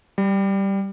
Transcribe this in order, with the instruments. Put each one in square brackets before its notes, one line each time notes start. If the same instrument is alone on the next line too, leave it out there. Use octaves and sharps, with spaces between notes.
[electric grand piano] G3